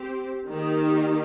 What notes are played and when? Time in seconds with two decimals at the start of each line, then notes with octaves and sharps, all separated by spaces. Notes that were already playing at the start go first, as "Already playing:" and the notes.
Already playing: C4 G4 C5
0.48 D#3 A#3 D#4 G4